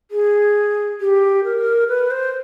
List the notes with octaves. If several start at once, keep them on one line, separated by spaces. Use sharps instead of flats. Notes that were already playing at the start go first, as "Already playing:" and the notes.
G#4
G4
A#4
B4
C5